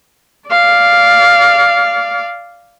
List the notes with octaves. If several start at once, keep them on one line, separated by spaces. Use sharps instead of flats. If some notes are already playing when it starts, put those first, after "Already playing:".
D5 F5